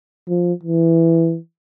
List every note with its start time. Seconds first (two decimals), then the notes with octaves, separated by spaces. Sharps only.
0.28 F3
0.64 E3